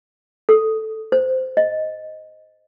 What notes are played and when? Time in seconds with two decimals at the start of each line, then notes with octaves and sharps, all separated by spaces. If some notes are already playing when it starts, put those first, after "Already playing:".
0.49 A4
1.12 C5
1.57 D#5